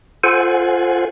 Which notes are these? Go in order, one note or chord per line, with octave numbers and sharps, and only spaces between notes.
F4 A4 C5 F#5 G#5